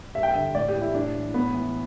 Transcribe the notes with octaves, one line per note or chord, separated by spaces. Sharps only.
G2 E5
G5
E5
D3
A2 D5
G4
E3
E4
A2 D4
E3
A2 B3
E3